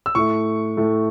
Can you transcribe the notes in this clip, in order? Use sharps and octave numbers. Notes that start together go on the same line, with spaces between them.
E6
A2 A3 C#6
A2 A3